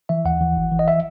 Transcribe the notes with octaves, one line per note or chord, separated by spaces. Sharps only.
E3 E5
D#2 F#5
E3
G#1
E3
D#5
E5